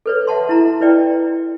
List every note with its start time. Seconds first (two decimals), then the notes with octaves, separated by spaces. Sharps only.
0.06 A4 B4 C#5
0.27 E5 F#5 A5 C6
0.49 E4 A#5
0.80 E4 B4 D5 G5